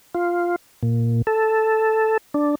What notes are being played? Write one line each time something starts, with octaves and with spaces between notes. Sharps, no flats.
F4
A#2
A4
D4